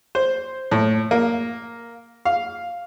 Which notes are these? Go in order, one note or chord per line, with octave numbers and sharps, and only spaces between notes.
C5
A2
A#3
F5